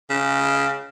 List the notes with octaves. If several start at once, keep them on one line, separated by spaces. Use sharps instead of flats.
C#3